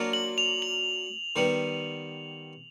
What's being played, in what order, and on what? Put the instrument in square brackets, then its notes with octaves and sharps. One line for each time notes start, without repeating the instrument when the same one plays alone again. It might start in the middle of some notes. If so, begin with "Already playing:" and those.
Already playing: [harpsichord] F#3 A#3 D4 F4
[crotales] F#7
F7
F#7
[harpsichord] D#3 G3 B3